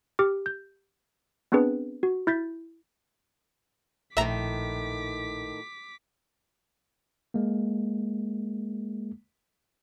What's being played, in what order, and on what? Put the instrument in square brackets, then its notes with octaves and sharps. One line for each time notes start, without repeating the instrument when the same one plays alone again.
[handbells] G4 D6 F6
G6
B3 C4 D4 G#4 B4
F#4
E4 G6 A6 B6
[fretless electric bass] A#1 [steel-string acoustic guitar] A2 D#3 [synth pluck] E5 A#5 [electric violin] D6 B6
[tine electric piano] G#3 A#3